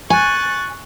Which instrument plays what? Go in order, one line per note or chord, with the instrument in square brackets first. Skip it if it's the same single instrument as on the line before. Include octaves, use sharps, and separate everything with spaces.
[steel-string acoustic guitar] G#5 [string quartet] C#6 F#6 A6